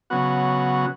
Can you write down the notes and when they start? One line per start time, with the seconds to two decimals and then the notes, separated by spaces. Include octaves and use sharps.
0.10 C#3 F#3 B3 F#4